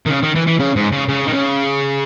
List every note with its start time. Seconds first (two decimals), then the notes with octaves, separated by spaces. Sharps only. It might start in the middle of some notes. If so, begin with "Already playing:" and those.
0.06 D#3
0.10 C#3
0.23 D#3
0.35 E3
0.47 E3
0.59 C#3
0.76 G#2
0.92 C#3
1.08 C#3
1.26 D#3
1.32 C#3